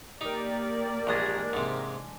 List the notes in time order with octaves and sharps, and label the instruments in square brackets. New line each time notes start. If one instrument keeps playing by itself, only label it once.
[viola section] A#3 D5 [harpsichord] D#4 [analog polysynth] G4 A#4
[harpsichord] A#1 D#5 D#6 [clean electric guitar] E3 G#3 D4
[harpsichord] G#2 C3